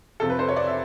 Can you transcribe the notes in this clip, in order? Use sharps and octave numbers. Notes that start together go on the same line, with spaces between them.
F2 C3 F3 A4
B4
C5
C#5
D5
E5